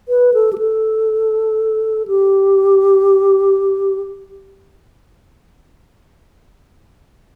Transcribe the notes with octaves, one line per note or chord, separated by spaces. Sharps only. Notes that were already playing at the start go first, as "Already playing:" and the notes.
B4
A4
G4
A4
G4